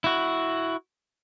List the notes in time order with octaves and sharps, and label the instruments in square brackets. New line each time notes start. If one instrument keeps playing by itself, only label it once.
[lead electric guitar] E4 F#4